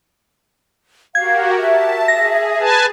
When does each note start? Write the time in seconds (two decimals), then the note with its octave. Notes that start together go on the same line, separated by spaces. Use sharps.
1.15 F#4 G4 A#4 F5 G#6
1.58 E5 A5
2.08 G#4 A#6
2.60 B4 G#5 A5